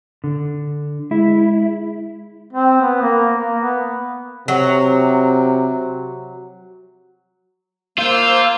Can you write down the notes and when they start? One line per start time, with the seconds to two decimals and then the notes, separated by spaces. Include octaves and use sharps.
0.24 D3
1.11 G#3 E4
2.53 C4
2.81 B3
3.02 A#3
3.34 A#3
3.59 B3
4.48 C3 F#3
7.98 A#3 F4 C5 E6